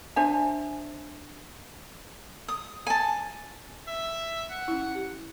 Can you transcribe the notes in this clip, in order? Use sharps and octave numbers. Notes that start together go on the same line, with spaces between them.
D4 C5 E5 G#5
D#6
G#5 A5
E5
F#5
C#4 E4
G4